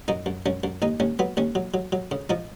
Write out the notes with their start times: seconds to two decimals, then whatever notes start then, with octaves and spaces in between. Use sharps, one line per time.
0.08 F#2 D#4
0.26 F#2
0.46 F#2 C#4
0.64 F#2
0.82 D#2 D#4
1.00 D#2 C#4
1.19 F#3 B3
1.37 D#2 C#4
1.55 F#3
1.74 F#3
1.92 F#3
2.11 C#3
2.29 F3 D#4